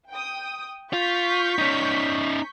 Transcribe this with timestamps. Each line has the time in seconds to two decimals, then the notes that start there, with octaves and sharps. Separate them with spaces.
0.10 G5 D#6
0.93 F4 C#6 G6 B6
1.58 C#4 D#4